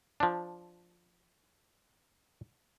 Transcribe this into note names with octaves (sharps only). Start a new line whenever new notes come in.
F3 D4